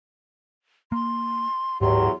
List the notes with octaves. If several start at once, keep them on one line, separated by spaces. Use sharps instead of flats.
A#3 C6
D1 E2 G#2 F#3 G4 C6